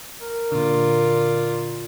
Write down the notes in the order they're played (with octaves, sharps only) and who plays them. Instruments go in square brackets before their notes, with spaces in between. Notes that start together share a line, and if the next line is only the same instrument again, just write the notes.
[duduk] A#4
[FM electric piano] A#2 D3 [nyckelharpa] F4 D5